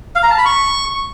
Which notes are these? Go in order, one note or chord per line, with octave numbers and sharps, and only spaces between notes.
F5
A#5
A5
B5
C#6